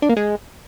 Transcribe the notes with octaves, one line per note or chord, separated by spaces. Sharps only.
D4
A#3
G#3